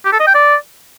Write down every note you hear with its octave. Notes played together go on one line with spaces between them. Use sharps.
G4
A4
D#5
G5
D5